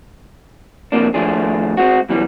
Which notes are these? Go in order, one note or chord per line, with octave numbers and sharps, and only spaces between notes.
F2 A2 C3 A#3 D4
A2 D#3 F3 A3 D4 G#4
G#3 C4 F#4
F#2 B2 E3 G3